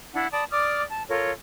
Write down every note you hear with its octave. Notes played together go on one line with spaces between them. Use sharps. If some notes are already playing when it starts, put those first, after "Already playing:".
D4 E4 F#5
D5 A5 B5 D#6
D5 D6 D#6 F6
A5
F4 A4 A#4 C#5